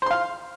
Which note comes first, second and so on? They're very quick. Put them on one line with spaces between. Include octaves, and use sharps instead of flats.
C5 C6 F5